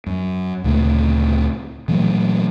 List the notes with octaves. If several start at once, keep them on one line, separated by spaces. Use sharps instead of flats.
F#2
D2 A#2 C#3 A3
A#2 E3 F#3 A3